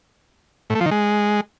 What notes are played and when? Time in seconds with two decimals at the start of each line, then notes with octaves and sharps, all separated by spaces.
0.70 A2
0.75 A3
0.81 F3
0.86 D#3
0.91 G#3